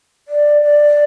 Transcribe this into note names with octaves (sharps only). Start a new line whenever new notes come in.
D5
D5